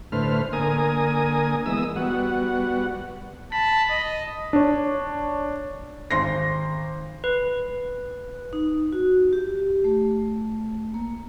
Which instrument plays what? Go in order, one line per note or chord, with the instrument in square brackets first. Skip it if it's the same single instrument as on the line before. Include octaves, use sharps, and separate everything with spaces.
[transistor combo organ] A2 D3 A3 B4 C5 F6
D3 A#3 A#4 G#5 D#6
E3 G#3 B3 D#6 E6
G3 B3 F#4 F#5
[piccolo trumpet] A5 [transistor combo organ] B5
[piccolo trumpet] D#5
[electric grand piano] D4 C#5
[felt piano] G#1 C6 A#6
[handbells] B4
[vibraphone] D#4
F#4
G4
A3
A#3